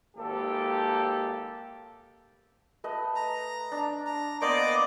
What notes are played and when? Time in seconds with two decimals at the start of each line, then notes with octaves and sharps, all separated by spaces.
0.16 G#1 A#3 G4 A4
2.84 A3 B4 D#5
3.16 A#5
3.72 D4
4.06 A#5
4.42 A#3 B3 C5 D5 D#5 D6